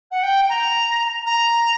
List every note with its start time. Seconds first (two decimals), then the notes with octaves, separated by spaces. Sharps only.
0.11 F#5
0.22 G5
0.49 A#5
1.26 A#5